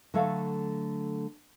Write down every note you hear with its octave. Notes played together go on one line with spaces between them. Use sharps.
D3 F#3 A3 A4 F5